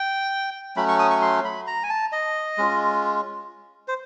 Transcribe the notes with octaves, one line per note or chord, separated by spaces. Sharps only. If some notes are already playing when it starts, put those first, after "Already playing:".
Already playing: G5
F#3 A3 C#4 B5
C#6
D#6
C#6
C6
B5
A#5
G#5
A5
D#5
G#3 C#4 F4
C5